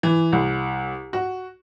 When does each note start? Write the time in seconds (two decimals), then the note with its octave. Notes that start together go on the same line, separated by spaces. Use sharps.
0.03 E3
0.33 C2
1.13 F#4